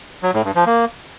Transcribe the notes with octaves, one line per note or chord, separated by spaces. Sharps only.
F#3
A2
G2
F3
A#3